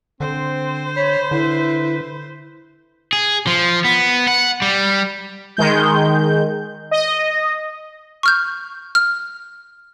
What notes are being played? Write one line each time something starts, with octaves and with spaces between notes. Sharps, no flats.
D3 C4 C5
C#5 B5
D3 E4 B4
G#4
F3
B3
F#5
G3
D#3 G#3 G6
D#5
C#6 F6 G6
F6